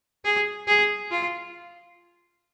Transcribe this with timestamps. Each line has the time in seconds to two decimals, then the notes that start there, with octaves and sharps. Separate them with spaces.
0.24 G#4
0.67 G#4
1.11 F4